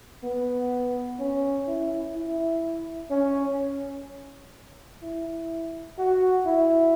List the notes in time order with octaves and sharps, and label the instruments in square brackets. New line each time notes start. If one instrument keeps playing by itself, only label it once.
[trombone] B3
C#4
E4
E4
C#4
E4
F#4
E4